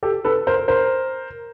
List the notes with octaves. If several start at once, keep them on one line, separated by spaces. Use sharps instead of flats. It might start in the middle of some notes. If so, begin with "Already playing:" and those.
G4 A4
A4 B4
A#4 C5
A#4 C5